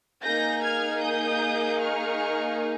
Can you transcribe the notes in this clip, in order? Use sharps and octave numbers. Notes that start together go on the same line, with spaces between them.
A#3 D#4 G#4 G6 A#6
F6 G#6
D#6 G6
C#6 F6